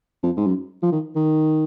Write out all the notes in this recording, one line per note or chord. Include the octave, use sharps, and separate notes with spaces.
F2
G#2
F#2
F3
D#3
D#3